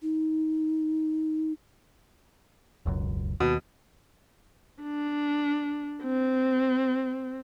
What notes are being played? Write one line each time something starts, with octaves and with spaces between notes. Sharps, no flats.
D#4
E1 C#2 F#2
D#2 B2
D4
C4